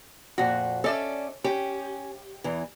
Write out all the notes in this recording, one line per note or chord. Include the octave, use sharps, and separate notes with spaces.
F2 A#2 F#4
C#4 A4 D5 E5
C#4 G4
E2 E3